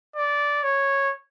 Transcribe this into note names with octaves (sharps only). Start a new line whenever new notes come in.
D5
C#5